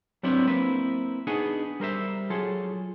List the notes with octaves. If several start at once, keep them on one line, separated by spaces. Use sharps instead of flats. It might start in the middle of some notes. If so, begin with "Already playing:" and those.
F#3 G3 B3 C4 D4 E4
A#3 C4 E4 B4
B3 D4 D#4 F#4 G#4 G#5
G3 A#4 C5 E5
F#3 F4 G#4 A4